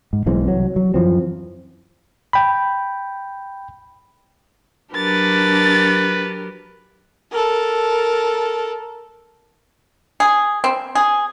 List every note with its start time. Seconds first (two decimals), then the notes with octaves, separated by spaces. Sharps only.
0.13 G#2
0.26 B1 E3 G#3 C4
0.48 C2 F#3
0.76 F#3
0.94 F#2 E3 F3 C4
2.33 G5 B5
4.93 F#3 D4 G4 A#4 B4 A6
7.31 A4 A#4
10.20 G#4
10.64 C4
10.95 G#4